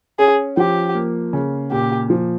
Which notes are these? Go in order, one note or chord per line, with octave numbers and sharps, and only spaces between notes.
C#4 G#4
F3 G4
A#3
C#3
A#2 G4
F3